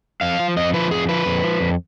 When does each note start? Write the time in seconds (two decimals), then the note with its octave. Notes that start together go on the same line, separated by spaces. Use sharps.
0.21 F2 F5
0.39 F3
0.56 F2 D#5
0.74 F3 B4
0.91 F2 G#4
1.09 F3 B4
1.26 F2
1.43 F3
1.60 F2